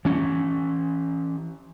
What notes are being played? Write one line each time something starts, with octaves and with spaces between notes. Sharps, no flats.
E3 C#4